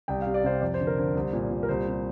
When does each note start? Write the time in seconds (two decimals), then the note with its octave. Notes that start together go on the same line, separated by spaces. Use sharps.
0.08 C2 G5
0.22 C3 F5
0.34 D5
0.44 C3 C5 F5
0.61 F2 D5
0.74 C5
0.80 D3
0.87 A#4
0.98 D3 C5
1.15 C2
1.33 A#2
1.50 A#2
1.63 A#4
1.69 C2 C5
1.87 C3